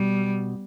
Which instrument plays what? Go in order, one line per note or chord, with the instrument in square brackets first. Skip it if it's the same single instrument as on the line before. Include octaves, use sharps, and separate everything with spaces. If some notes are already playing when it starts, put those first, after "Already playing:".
Already playing: [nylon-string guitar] B2 [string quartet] G3